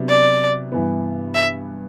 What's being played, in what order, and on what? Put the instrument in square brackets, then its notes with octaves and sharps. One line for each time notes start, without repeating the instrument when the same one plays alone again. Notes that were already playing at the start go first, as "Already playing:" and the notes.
Already playing: [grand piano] C3 F#3 B3 D4
[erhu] D5
[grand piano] G2 E3 B3
[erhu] E5